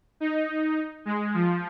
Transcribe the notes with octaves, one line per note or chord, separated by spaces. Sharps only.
D#4
G#3
F3